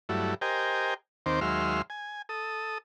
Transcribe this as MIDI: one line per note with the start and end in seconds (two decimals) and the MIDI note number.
0.09 0.34 43
0.09 0.34 54
0.09 0.34 57
0.09 0.34 64
0.41 0.94 67
0.41 0.94 70
0.41 0.94 72
0.41 0.94 75
0.41 0.94 79
0.41 0.94 80
1.26 1.40 39
1.26 1.40 51
1.26 1.40 60
1.26 1.40 72
1.26 1.40 86
1.41 1.82 39
1.41 1.82 54
1.41 1.82 56
1.41 1.82 76
1.41 1.82 84
1.41 1.82 89
1.90 2.22 80
2.29 2.78 69
2.29 2.78 87